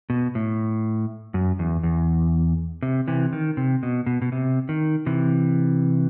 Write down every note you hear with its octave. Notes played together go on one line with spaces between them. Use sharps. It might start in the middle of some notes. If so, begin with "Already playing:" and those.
B2
A2
F#2
E2
E2
C3
C3 E3
D#3
C3
B2
B2
B2
C3
D#3
C3 E3